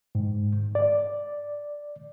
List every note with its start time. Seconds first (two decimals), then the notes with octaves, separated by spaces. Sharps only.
0.15 G#2
0.75 D5